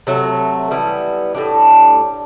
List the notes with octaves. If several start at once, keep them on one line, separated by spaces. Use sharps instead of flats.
C3 F#3 A3
E3 G3 B3
A2 G3 D4